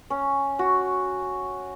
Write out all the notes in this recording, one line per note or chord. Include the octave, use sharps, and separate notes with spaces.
C#4
F#4